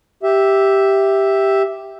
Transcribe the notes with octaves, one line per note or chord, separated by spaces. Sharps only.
G4 E5